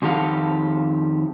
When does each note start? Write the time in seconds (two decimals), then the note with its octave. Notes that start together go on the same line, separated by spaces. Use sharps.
0.02 F2 D#3 G4 A4 F5 F#5